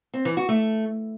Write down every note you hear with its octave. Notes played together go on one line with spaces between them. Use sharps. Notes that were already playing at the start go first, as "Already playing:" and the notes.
C4
E3
F#4
A3